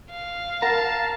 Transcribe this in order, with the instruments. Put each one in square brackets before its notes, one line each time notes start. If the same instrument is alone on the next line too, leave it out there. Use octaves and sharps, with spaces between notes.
[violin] F5
[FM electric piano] A#4 F#5 [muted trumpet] A5 [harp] A#5